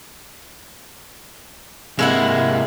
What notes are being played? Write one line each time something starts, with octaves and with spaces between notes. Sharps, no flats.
C3 G#3 A#3 E4 F#5